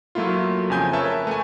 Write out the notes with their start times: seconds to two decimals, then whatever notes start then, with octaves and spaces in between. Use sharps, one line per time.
0.15 F#3 A3 A#3 E4 F4
0.70 F2 C#3 G#5 G6
0.93 A#4 B4 C#5 E5 A5
1.27 A3 G#5